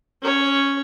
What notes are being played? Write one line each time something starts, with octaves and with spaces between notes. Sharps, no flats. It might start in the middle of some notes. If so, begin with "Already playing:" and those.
C#4 C#5